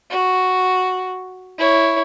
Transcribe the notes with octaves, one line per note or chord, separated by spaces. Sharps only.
F#4
E4 C#5